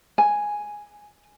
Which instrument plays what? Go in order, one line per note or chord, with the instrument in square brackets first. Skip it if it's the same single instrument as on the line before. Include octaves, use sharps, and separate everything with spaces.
[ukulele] G#5